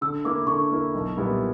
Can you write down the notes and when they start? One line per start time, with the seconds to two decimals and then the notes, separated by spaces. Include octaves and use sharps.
0.01 D3 E6
0.24 A#3 E4 D6
0.47 D3 C#6
0.70 A#3 E4
0.94 B1
1.16 A#2 G3 B3 E4